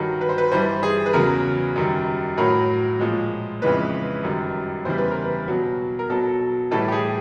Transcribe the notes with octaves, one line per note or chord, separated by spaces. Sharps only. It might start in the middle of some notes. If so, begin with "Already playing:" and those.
Already playing: G2 D#3 F#3
B4
C5
B4
G2 E3 G3 C5
G#4
B4
E2 C#3 F#3 A#4
F#2 D#3 G3
A2 F#3 A#4
A#2 F3 G#3
F2 C#3 E3 G#3 B4
F#2 D#3 G3
E2 C#3 E3 G3 C5
B4
A#4
B4
B2 F#3
A#4
B2 F#3 A4
A2 E3 G3 A4
G4
G#4